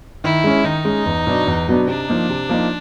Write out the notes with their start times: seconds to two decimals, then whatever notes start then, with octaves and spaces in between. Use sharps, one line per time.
0.24 D#3 E4
0.44 G#3 C#4
0.64 D#3 D#4
0.85 G#3 C#4
1.06 E2
1.27 B2 F#3 B3 D4
1.47 E2
1.68 B2 F#3 B3 D4
1.87 C3 D4
2.08 F3 A#3 D#4
2.29 C3
2.49 F3 A#3 D#4